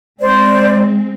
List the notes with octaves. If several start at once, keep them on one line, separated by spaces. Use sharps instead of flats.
G#3 C4 C5 D5